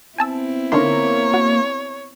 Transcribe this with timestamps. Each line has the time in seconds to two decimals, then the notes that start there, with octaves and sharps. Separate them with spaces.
0.18 B3 C4 E4 G#5 A5 E6
0.72 D3 A#3 D#4 C#5 C6
1.34 F#4